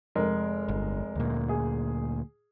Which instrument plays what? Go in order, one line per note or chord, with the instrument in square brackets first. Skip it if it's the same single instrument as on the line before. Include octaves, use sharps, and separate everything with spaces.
[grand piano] F1 G#3 A#4
[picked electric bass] G1
D2 A#2
[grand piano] G#4